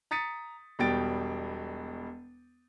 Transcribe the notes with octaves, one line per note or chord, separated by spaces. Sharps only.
A#5 D#6 A6 B6 C#7 D#7
E1 B2 G3 G5 A6 D7